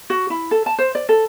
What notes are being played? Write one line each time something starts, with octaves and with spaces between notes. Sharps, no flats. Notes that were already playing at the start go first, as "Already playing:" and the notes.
F#4
E4
A4
A5
C5
D5
A4